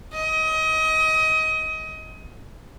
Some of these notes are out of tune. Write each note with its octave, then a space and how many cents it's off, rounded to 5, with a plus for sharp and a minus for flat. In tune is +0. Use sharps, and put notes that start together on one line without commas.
D#5 +25